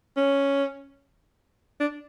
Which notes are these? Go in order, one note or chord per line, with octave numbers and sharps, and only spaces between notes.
C#4
D4